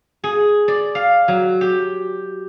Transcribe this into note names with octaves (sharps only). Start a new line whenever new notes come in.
G#4
D5
F5
F#3
G4